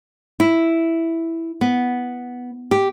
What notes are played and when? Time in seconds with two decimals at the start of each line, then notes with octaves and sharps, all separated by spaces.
0.40 E4
1.61 B3
2.71 G4